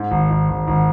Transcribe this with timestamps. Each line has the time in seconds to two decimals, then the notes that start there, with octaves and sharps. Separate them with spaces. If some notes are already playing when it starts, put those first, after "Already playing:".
Already playing: G#2
0.11 G#1
0.30 G#1
0.49 G#1
0.67 G#1